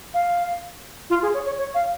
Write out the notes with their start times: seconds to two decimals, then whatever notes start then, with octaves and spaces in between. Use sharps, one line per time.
0.14 F5
1.10 F4
1.22 G#4
1.34 C#5
1.46 C#5
1.58 C#5
1.74 F5